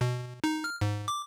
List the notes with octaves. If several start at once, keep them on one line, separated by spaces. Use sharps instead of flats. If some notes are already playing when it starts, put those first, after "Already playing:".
B2
D#4
F6
G#2
D6